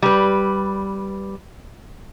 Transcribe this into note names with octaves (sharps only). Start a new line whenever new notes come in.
G3 B4